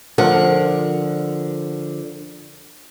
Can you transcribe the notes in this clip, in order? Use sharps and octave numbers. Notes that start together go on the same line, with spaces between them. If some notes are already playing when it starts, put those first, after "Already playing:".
D3 F3 A#4 F#5